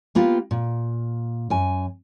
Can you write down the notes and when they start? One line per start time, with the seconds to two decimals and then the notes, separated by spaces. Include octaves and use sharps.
0.15 A#3 B3 F4 G4
0.51 A#2
1.50 F#2 G#5